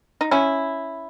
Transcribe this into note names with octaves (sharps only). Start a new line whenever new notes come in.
D#4
C#4 E4